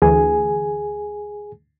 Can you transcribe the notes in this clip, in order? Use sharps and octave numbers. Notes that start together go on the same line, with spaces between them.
D2 E3 G#4 G#5